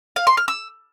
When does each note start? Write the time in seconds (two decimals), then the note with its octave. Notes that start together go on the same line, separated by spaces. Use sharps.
0.16 F5
0.27 C6
0.37 F6
0.48 E6